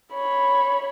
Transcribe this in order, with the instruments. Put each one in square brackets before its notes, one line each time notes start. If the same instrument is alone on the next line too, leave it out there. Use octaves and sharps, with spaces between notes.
[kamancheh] C#5 B5